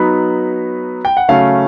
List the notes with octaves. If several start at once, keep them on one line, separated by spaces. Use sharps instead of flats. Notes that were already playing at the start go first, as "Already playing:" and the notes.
Already playing: F#3 B3 D#4 B5
G5
F#5
C#3 F#3 A3 C#4 F5